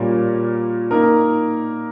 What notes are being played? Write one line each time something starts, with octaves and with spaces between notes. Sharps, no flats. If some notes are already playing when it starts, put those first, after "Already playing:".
Already playing: A#2 G3 A#3 C#4
A#3 D#4 A#4